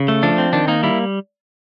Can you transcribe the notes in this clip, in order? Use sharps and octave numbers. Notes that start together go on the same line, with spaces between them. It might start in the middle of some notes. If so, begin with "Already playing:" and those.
Already playing: C#3
A3
F3 D4
C4
D#3 D4
A#3 D#4
G3 E4